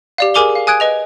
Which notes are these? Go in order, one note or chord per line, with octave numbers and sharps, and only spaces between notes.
G4 D5 F5
G#4 A#4 G#5 D6 F7 G7
F5
G#5 D#6 F#6 G#6 D7
B4 D#5 F7